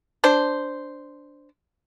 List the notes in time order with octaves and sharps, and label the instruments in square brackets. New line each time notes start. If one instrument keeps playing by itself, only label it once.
[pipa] D4 C5